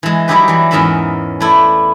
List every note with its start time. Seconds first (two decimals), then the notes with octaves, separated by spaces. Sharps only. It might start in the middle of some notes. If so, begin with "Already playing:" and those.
0.03 E3 G#3
0.28 F#3 G3 D#4 E4 G4 B4
0.48 E3 F#3
0.71 E2 G#2 C#4 A#4 E5 B5
1.40 A3 E4 D5